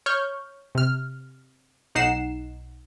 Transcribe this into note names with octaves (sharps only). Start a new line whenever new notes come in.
C#5 C#6 F6 G6
C3 F6
B1 D#4 F#5 C7 E7